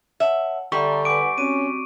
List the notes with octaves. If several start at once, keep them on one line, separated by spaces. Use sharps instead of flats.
C#5 E5 F#5 A5
D3 G3 E5 A#5 C6 C#6
B4 F#5 G#5 D6 D7
C4 C#4 F#4 D#7